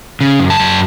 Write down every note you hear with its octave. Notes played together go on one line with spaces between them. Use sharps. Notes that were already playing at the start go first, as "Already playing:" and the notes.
C#3
F#2
A5
F#2